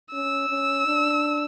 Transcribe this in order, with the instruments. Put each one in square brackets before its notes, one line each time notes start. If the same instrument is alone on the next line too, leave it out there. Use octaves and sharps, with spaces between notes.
[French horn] C#4 [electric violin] E6
[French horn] C#4
D4